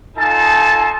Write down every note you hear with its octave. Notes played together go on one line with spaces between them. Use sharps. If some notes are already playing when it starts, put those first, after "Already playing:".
D#4 F4 A4 G#5 A5